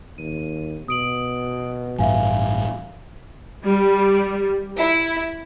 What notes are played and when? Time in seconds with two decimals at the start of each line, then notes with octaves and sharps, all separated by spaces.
0.18 D#2 D#7
0.88 B2 D#6 D7 F#7
1.99 A1 G2 E5 F5 G#5
3.64 G3
4.77 E4